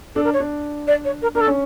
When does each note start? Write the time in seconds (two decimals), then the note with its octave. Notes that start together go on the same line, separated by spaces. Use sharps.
0.15 D4 A4
0.24 A#4
0.33 C#5
0.40 D4
0.88 D5
1.05 C#5
1.22 A#4
1.35 D4 A#4
1.41 A4
1.47 C#4